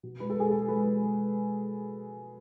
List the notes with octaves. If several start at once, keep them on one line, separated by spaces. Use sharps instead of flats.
B2
G#3 B4
A4
G#3 G#4
B2 A4
G#3 B4
G#3
G#3